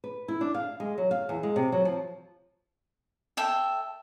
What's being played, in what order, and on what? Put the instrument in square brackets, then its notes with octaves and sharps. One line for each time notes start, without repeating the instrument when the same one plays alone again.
[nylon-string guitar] B4
E4
D4
F5
G#3
F#3
F5
E2
G#3
C3
F#3
F3
[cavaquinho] A4 E5 G5